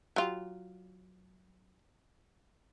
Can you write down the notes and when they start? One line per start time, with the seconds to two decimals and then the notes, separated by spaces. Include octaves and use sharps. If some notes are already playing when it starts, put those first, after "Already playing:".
0.16 F#3 F4 G4